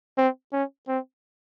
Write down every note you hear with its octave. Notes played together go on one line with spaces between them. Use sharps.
C4
C#4
C4